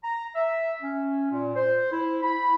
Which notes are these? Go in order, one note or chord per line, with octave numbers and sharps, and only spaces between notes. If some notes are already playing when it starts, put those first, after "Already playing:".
A#5
E5
C#4
A#2
C5
E4
B5